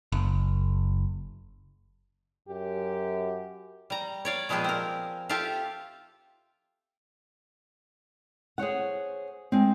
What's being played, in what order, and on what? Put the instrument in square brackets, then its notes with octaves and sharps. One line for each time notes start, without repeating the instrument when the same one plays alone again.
[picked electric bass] F#1
[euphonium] F#2 [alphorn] G4
[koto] G3 A#5
C#5 D5 F5
A#2 F3 G#3 B3 G4 G#4
C4 A#4
F4 G4 A4 E5 F5
[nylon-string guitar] G#4 C5 C#5 F#5
G#3 C4